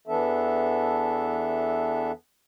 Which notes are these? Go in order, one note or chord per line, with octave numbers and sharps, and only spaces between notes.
E2 E3 B3 D4 A4 E5